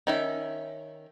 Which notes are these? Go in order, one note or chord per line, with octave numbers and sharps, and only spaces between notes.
D#3 C#4 E5